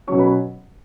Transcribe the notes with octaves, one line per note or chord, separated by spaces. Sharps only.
B2 F#3 C#4 C#5 C#6
B4 B5